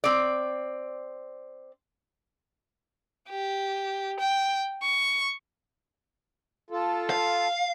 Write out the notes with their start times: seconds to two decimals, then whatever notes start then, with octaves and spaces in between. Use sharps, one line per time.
0.04 C4 D5
3.30 G4
4.20 G5
4.82 C#6
6.70 F4 A4
7.10 F5